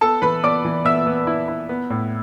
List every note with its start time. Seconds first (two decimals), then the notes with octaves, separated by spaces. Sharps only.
0.01 B3 A4 A5
0.22 E3 B4 B5
0.43 B3 D5 D6
0.65 E3
0.85 B3 E5 E6
1.06 B3
1.27 E4
1.48 E4
1.69 B3
1.90 A2